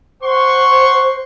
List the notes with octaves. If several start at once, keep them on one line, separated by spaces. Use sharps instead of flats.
C5 F#5 C6 C#6